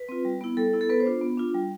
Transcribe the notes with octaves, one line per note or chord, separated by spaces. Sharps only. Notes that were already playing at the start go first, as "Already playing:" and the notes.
Already playing: B4
C4 F4
G3
B3 E4
G3 A4
B3 E4
A4
B3 B4
C5
D4 F4
B3
D4 F4
G3